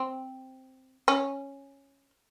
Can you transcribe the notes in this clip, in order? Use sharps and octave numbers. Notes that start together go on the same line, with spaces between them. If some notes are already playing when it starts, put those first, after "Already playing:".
Already playing: C4
C#4